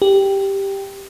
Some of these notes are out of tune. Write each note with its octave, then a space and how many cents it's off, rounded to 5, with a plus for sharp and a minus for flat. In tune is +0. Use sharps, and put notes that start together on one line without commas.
G4 +0